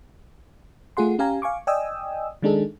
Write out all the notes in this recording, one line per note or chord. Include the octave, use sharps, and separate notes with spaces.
A3 F4 G#4 F#5 C6
C#4 G4 F5 G#5 A#5
F5 G#5 C#6 D6
D5 D#5 G5 G#5 D#6 E6
D#3 G#3 D4 D#4 G#4 A4